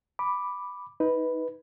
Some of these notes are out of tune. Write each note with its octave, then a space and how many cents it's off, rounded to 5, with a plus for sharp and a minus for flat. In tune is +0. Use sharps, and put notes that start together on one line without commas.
B5 +0 D6 +0
D#4 +25 B4 +0